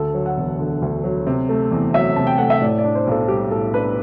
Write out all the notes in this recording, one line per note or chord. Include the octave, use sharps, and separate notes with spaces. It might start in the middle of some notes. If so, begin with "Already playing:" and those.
Already playing: D2 A4
F#3
F#5
E1
D3
D2
F#3
C3
A3
E2
F#3 E5
C3 A5
G5
A3 F#5
E5
A2 D5
D5
D4
C5
B1 A4
G3 G4
A2 A4
D4 B4